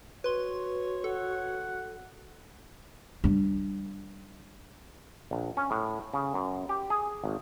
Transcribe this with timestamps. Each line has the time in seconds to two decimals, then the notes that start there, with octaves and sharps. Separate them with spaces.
0.24 F#4 B4 C#5 C6
1.04 A4 F#5
3.24 G3 D4
5.31 A#1
5.57 C#4
5.71 A2
6.14 C#3
6.34 F#2
6.69 G4
6.90 G#4
7.24 G#1